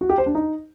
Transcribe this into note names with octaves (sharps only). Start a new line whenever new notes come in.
F#4
G4
C5
D4
D#4